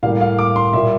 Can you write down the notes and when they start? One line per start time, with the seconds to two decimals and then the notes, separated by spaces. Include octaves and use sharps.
0.03 A2 G3 A#3 F5
0.21 F5
0.39 D6
0.56 C6
0.73 A#2 G3 A#3 E5